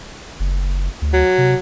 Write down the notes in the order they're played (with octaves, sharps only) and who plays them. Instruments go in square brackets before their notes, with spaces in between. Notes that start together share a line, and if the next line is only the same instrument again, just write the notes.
[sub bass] F#1
D2
[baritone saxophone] F#3
[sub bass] C3